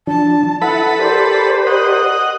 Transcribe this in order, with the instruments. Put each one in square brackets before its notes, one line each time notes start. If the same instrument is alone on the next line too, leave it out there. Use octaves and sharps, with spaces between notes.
[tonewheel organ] F3 D4 [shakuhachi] A5
[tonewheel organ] E4 E5 [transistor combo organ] A4 B4 B5 [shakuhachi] F#5
[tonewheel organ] G4 A#4 D5 [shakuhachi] C5
[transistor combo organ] D#5 F#5